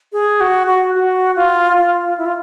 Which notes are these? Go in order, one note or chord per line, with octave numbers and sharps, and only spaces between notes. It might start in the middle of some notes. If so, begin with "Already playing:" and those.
G#4
F#4
F#4
F#4
F4
F4
E4
F4